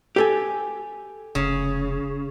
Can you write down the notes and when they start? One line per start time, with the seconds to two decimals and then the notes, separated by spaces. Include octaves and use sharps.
0.16 G4 A4 G#5
1.35 F1 C#3